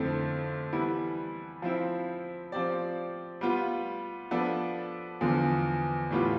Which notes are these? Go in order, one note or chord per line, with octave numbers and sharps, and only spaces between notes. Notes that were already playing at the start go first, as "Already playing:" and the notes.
Already playing: F2 D3 A3 C4 E4
E3 G3 B3 E4
F3 C4 E4
F3 C4 G4 D5
G3 B3 F4
F3 B3 D4 A4
E2 D3 F3
A2 E3 G3 B3 F4